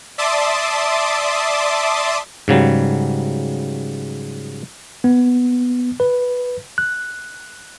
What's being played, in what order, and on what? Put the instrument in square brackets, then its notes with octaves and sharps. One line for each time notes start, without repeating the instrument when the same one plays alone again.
[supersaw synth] D5 E5 A5 C6 D6 D#6
[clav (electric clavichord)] G#2 C#3 F#3 G3
[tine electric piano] B3
B4
F#6